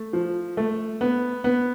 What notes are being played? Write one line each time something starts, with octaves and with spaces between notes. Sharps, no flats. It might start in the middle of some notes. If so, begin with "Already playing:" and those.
Already playing: A3
F3
A3
B3
B3